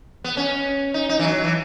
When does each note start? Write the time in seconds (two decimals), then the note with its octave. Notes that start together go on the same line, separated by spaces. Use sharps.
0.24 B3
0.37 C#4
0.94 D#4
1.09 D#4
1.19 E3
1.24 F#3
1.44 E3